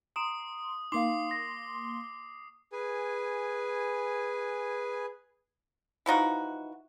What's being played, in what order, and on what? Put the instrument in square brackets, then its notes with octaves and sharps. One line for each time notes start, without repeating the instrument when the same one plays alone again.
[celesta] A#5 D7 E7 [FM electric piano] C6 [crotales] D#6
[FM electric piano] A#3 C6 [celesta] D#4 F5 [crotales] D6 C7
[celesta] A#6
[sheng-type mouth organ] G#4 B4 G#5
[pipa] E3 F3 D#4 F#4